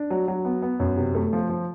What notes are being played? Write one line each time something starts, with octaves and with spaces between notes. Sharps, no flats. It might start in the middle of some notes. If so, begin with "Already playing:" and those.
Already playing: D4
F#3
F#3
B3
B3
F#2
C3
A3
F3
F3